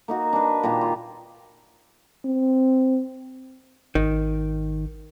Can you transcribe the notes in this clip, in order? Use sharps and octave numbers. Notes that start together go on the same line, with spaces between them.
A#3 D#4 F#4
D4 B4
A#2 D#3 A#3 G4
F4
C4
G#1 D#3